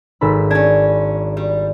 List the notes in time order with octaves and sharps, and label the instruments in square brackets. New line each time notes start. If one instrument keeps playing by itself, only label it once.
[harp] G#1 A4 B5
[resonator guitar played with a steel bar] C#4 D4 [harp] G#6
[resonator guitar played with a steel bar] G3